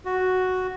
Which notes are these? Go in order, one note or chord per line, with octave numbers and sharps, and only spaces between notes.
F#4